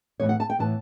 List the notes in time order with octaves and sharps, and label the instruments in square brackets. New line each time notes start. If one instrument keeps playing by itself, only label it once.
[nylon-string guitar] A2 E3 B3 C#5
F#5
A5
G5
A2 E3 B3 A5